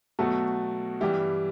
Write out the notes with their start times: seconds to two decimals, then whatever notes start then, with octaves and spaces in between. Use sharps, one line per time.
0.19 B2 F#3 A3 F#4 A4
1.01 G2 E3 G3 E4 G4